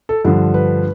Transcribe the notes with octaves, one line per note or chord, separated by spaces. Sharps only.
A4
G2 D3 F3
B4